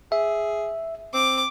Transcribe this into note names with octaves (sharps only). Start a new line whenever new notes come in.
G#4 E5
C4 D6